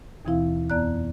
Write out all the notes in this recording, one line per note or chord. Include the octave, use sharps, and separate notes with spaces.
D#2 B2 E3 C4 E4 F5
F2 B3 D5 A#5 F#6